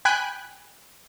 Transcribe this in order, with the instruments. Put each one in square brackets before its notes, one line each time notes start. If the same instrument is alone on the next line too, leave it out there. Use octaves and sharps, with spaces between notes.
[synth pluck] G5 G#5 B5 F#6